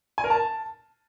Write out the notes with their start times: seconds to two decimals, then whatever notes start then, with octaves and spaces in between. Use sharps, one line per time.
0.18 G#5
0.24 A#4
0.30 A5